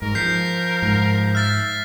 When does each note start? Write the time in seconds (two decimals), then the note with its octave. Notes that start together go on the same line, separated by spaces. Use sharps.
0.02 G#2 A#4
0.15 F3 G6 B6 C7
0.83 G#2
1.35 E5 F6 A6 B6